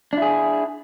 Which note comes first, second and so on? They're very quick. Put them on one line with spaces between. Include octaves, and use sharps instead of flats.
D4 E4 G#4